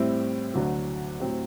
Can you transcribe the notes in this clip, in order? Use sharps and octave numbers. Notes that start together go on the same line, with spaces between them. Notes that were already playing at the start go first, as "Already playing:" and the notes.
Already playing: A2 G3 C4 E4
D2 D3 F#3
A2 F#3 C4 G4